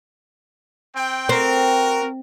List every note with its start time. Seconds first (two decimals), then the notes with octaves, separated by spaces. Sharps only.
0.94 C4 G5
1.29 C4 F#4 A#4